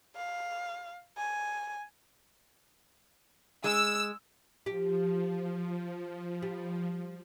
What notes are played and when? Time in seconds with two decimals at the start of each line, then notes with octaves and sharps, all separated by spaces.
0.16 F5
1.17 G#5
3.64 G#3 E6
4.66 F3 G4
6.42 G3